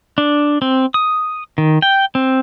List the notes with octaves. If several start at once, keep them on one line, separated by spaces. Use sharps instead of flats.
D4
C4
D#6
D#3
G5
C4